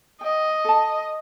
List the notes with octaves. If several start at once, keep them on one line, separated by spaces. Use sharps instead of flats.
D#5 G5
A4 A5